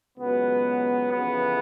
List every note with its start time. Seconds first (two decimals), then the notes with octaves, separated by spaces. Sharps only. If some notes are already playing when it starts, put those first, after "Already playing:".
0.18 C#2 B2 F#3 B3
1.11 F2 C#3 E3 B3